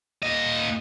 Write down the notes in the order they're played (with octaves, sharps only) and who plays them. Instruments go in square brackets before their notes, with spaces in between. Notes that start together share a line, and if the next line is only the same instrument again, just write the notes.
[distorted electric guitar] A#2 D#5